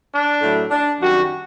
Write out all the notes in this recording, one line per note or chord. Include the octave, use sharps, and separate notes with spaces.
D4
A2 F#3 A3
D4
F#2 D#3 G3 F#4